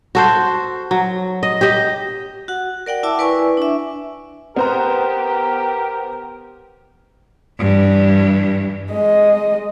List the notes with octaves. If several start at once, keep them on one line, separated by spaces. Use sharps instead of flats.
F#4 A4 C5
F#3
D#5
G4 D#5
F#4 F#5
A#4 D5 F#5 G5
E4 E5 A5 D6 E6
E4 B4 D5 G#5 C#6
D4 E5
B3 G4 A#4 C5 A#5
G2 E3
G#3 D#5